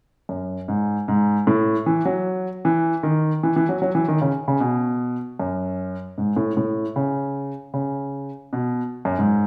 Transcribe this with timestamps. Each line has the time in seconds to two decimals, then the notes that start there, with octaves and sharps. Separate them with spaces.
0.29 F#2
0.68 G#2
1.08 G#2
1.47 A2
1.86 E3
2.05 F#3
2.65 E3
3.03 D#3
3.43 E3
3.56 E3
3.69 F#3
3.82 F#3
3.95 E3
4.08 D#3
4.22 C#3
4.48 C#3
4.60 B2
5.39 F#2
6.18 G#2
6.36 A2
6.57 A2
6.96 C#3
7.74 C#3
8.53 B2
9.05 F#2
9.18 G#2